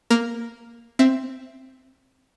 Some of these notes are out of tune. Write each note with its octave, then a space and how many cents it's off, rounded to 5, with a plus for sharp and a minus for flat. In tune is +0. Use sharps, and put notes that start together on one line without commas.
A#3 +0 A#4 +0
C4 +0 E5 +10